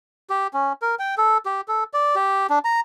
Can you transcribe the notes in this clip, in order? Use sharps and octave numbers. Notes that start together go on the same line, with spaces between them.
G4
C#4
A#4
G5
A4
G4
A4
D5
G4
D4
A#5